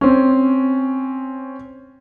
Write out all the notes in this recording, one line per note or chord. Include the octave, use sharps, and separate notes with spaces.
C4 C#4